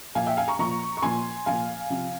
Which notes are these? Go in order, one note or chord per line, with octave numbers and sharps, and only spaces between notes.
A#2 F3 F5 G#5
E5 G5
F5 G#5
A#5 C#6
A#2 F3 A#5 C#6
C#6
A#2 F3 G#5 C6
A#2 F3 F5 G#5
C3 F3